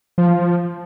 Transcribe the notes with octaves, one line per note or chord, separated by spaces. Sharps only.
F3